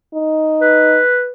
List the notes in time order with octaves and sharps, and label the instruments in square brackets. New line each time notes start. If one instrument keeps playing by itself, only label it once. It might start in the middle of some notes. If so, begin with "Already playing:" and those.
[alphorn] D#4
[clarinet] B4